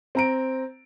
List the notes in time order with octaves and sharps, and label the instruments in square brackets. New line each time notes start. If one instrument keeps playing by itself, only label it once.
[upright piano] C4 A#5 D7